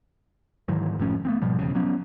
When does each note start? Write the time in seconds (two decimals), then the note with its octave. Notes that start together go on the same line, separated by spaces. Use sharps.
0.68 G#2 D#3 E3 F#3
0.98 F#1 A2 F3 C#4
1.25 A3 B3 C4
1.42 G#2 B2 F3 G3
1.59 E1 B1 E2 C#3
1.75 F#3 B3 C#4